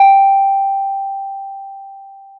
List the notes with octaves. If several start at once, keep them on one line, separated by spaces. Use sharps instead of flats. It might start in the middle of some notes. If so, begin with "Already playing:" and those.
Already playing: G5